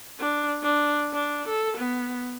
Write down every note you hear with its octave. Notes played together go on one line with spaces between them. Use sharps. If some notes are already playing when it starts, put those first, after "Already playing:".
D4
D4
D4
A4
B3